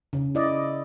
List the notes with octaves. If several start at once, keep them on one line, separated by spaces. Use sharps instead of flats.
C#3
E4 D5 D#5